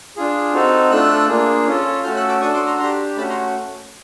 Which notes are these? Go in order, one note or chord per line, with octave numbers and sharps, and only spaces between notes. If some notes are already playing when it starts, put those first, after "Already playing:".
D4 F4 G#4
C4 D#4 F#4 A4
A3 D4 F4 A4 E6 F#6
A#3 D4 F4 G#4
C#4 F4 A4
A3 C#4 F#4 A4 F6 G6
E6 F#6
D6 E6
D4 F#4 A4 C#6 D#6
C6 D6
A#5 C6
D4 G4 A#5 C6
A3 C#4 F#4 A5 B5
A#5 C6